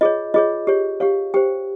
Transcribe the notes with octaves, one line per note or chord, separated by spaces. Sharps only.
F4 G#4 C#5 D#5
F4 G#4 C#5 D#5
G4 C#5
G4 C#5 F5
G4 C5 G5